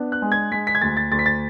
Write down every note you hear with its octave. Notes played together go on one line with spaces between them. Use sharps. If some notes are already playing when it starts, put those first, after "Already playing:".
Already playing: B3 D4
F#6
G#3
G#6
G#3 B6
B6
G#6
D2 A6
A6
D2 A6
B6
A6